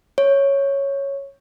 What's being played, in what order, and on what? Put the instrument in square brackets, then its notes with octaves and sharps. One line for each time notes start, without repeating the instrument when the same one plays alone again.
[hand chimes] C#5